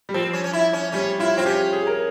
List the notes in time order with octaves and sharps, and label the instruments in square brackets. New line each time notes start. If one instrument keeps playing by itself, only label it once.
[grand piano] G3
[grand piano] F3 [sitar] C4
[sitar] C#4
C#4
E4
C#4
[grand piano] G3 [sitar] C#4
[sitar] E4 [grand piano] F4
[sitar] C4 [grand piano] F4
[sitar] C#4 [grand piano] G4
[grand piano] G#4
A#4